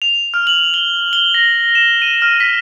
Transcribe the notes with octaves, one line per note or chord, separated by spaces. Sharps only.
F7
F6
F#7
G7
G7
A#6
E7
D#7
F6
B6